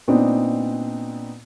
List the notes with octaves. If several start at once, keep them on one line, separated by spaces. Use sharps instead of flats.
A#2 B3 C4 D4 D#4